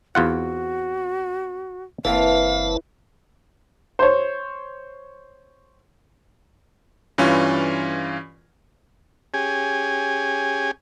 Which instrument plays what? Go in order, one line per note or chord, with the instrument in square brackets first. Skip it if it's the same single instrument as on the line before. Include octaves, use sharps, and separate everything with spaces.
[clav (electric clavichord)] E2 F4 F#5 [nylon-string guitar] C4 [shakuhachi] F#4
[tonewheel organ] F#1 B4 A5 [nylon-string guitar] E3 A#3 C4 [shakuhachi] F5
[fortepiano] C5 C#5
[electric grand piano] G2 E3 C#4 F4
[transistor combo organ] C#4 G4 G#4 G#5